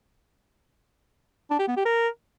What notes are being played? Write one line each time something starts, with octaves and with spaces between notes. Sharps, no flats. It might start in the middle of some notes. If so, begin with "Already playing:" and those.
D4
G4
B3
G4
A#4